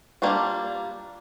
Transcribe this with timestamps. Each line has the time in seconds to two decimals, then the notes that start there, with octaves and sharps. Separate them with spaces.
0.22 G3 A#3 D4 F4